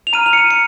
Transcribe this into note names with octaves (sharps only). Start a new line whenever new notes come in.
F7
A#5 F6 D#7
F7
C#7
D#7
C#7